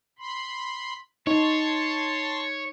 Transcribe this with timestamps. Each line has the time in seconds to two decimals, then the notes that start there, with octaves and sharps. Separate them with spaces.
0.19 B5 C6
1.27 D#4 C#5 A5 C6